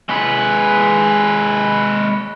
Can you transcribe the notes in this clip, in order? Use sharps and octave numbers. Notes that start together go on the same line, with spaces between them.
G#3 B4